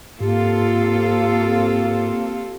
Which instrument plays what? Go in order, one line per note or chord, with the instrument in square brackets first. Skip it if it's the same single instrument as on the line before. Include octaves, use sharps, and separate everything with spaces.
[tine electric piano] G#2 [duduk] A#3 [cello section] C4 F4 A4 [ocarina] G4